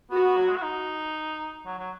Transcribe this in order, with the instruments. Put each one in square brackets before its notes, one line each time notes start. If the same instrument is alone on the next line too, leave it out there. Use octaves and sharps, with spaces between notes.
[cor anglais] B3 [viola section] F#4
[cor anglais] B3
F#3
G#3
F#4
D#4
F#3
F#3